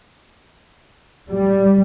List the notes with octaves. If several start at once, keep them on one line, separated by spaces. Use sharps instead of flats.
G3